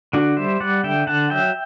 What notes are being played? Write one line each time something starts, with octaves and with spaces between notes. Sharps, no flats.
D3 D4 F#4
G3 C5 E5
G3 D5 F#5
D3 E5 G5
D3 F#5 A5
F#3 E5 G5